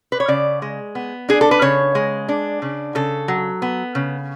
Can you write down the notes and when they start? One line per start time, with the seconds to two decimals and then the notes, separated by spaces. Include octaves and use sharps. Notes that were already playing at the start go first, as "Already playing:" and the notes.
0.12 B4
0.20 C#5
0.28 C#3 D5
0.62 G#3
0.95 B3
1.29 D4 G#4
1.41 A4
1.51 B4
1.62 C#3 C#5
1.95 G#3
2.29 D4
2.62 C#3
2.95 C#3 A4
3.28 F#3
3.62 B3
3.95 C#3